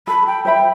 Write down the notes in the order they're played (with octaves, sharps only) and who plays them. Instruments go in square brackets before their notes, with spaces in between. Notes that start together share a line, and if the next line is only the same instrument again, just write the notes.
[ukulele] A4 [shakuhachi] B5
[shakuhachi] G5
[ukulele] C5 E5 B5 [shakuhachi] G5